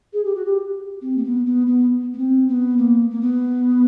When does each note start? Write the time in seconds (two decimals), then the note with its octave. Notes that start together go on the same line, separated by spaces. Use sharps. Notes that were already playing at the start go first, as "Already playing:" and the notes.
0.13 G#4
0.24 G4
0.35 F#4
0.45 G4
1.01 C4
1.17 A#3
1.23 B3
1.46 B3
1.67 B3
2.13 B3
2.18 C4
2.48 B3
2.77 A#3
3.10 A#3
3.21 B3